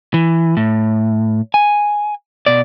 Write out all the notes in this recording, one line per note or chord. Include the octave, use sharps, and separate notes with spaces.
E3
A2
G#5
B2 D5